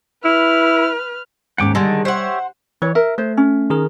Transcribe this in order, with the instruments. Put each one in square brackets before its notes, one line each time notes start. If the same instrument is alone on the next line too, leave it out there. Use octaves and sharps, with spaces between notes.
[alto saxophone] E4 [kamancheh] B4 F6
[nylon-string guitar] D#2 G#2 C#4 [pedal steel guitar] F#5 G5 D6
[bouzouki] D3 G#3 [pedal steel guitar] D#3 D5 D#5 [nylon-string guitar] G3
[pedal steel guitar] G4 C#5 E5 [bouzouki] C5 F#5
[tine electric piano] E3 [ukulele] C#5
[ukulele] A#4 [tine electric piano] E5
[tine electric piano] A3 [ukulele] C5
[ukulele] C#4
[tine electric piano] D#3 G#4 A#4